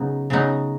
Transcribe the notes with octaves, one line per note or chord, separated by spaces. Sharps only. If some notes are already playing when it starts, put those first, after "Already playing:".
Already playing: C#3 F#3 B3 D#4
C#3 F#3 B3 D#4